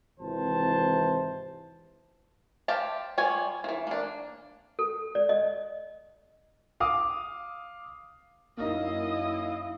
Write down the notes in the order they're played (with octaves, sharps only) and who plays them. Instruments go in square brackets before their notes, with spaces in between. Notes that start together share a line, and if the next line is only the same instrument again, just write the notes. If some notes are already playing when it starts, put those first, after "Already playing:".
[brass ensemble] G#1 C3 E3 C5 A5
[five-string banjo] G4 C5 F5 A5
G3 F4 C#5 G#5
E3 F3
A#3 D4
[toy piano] A4
D5
D#5
[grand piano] F5 D6 D#6
[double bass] F#2 E4 [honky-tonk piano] A#3 D#4 [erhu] D#5 [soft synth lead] F5